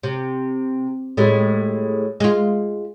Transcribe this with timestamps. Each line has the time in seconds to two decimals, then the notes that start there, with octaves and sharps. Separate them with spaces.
0.03 C3
1.17 A2 G3 G#3
2.20 G#3 F4